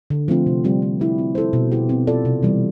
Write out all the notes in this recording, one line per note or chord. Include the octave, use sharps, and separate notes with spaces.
D3
F3 A3 C4 F4
C3
G3 C4 F4
C4
E4 G4 B4
C4
E4 A4 C5
B2
B3 E4 G4
C4
F4 A4 D5
C3
E3 G3